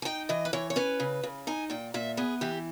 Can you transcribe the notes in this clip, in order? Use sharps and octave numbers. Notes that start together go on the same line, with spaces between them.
G#5
D#4 G5
E3 D#5
B4
E3 C#5
C#5
C#4 B4
C#3
C#3
D#4 G#5
A#2 G5
A#2 E5
B3 G#4
E3 G4